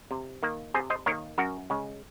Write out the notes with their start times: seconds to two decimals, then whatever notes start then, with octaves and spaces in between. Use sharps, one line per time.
0.11 C3
0.43 D#3 A#3
0.74 C3 G#4 C5
0.90 C5 D#5
1.06 D#3 A#3 A#4 C#5
1.38 F#2 F#4 A#4
1.70 C#3 G#3